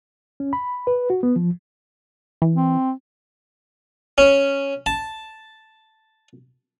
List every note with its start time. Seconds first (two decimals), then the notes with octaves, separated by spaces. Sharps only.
0.40 C#4
0.53 B5
0.87 B4
1.10 F#4
1.23 B3
1.36 F3
2.42 E3
2.55 C4
4.18 C#4
4.86 A5